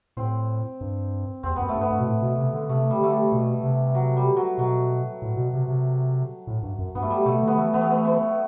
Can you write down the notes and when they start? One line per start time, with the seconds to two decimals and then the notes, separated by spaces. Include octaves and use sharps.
0.17 A2 C4
0.81 G2
1.43 E2 C4
1.56 F#2 B3
1.69 A3
1.75 G2
1.81 B3
1.90 G2
1.99 B2
2.07 A2
2.22 B2
2.38 C3
2.53 D3
2.69 C3 A3
2.91 G3
3.00 D3 A3
3.11 G3
3.32 B2
3.63 C3
3.95 F#3
4.17 G3
4.37 F#3
4.58 B2 F#3
5.22 A2
5.37 B2
5.53 C3
5.68 C3
6.47 A2
6.62 G2
6.79 F#2
6.95 G2 B3
7.02 A3
7.10 G3
7.25 B2 A3
7.42 D3
7.48 B3
7.57 E3 A3
7.74 E3 B3
7.81 A3
7.91 B3
8.05 B3